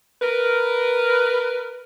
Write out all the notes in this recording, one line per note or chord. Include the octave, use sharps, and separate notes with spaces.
A#4 B4